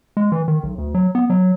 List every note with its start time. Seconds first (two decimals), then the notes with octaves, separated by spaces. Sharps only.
0.17 G#3
0.32 E3
0.48 D#3
0.63 B1
0.78 D2
0.94 F#3
1.15 B3
1.30 F#3